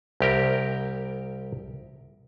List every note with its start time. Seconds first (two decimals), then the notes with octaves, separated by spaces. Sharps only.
0.20 C2 G4 A#4